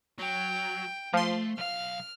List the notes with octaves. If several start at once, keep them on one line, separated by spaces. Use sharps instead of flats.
F#3 G5
F3 A3 C6
B1 F5 F6